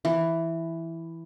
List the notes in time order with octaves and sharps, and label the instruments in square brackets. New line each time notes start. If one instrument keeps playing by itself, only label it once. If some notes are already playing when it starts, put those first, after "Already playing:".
[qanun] E3